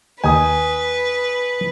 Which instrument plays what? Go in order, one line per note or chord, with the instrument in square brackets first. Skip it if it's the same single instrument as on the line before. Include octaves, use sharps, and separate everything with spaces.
[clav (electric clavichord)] D#2 D#4 G5 [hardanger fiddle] B4 [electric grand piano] G#5 D#6